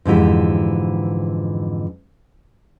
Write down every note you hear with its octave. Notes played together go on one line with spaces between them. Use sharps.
F2 G#2 D3 E3 G4